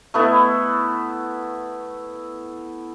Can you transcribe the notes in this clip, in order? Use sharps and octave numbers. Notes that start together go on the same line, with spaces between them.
A3 B3 E4